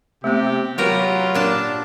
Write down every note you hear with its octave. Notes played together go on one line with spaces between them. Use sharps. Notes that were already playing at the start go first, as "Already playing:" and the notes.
C3 A3 B3 G4
F#3 F4 G4 A#4 B4
A#2 D4 A5